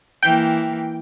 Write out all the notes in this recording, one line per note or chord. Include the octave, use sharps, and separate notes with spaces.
E3 A#3 G5